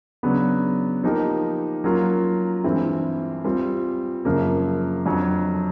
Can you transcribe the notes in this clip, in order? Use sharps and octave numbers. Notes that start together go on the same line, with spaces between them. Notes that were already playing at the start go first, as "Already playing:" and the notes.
C#3 F#3 B3 D4
F3 A#3 D#4 G4 A#4
F#3 A#3 C#4 F4
G2 E3 G#3 C4 E4
G3 C4 F4
F#2 C#3 F3 A#3
F2 D3 F#3